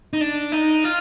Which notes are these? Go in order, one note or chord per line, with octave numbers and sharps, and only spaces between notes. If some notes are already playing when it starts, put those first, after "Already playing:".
D#4
D4
D#4
F4